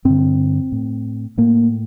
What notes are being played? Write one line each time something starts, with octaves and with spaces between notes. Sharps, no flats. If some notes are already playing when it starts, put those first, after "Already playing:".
G2 D3 C4
A2
A2 A#3